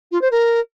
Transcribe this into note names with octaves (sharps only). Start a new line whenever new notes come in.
F4
C5
A#4